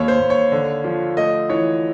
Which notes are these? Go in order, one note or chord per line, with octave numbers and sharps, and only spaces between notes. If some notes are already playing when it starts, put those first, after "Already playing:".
Already playing: D#2 C#5
C5
D#2
C#5
D3
F3
A3 D#5
E3 C#5